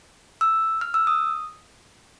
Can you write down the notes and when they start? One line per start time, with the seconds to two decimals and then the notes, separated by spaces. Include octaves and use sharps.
0.41 E6
0.81 F6
0.94 E6
1.07 D#6